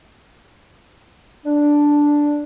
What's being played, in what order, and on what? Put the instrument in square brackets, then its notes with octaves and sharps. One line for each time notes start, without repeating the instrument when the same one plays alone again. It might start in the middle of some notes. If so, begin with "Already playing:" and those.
[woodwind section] D4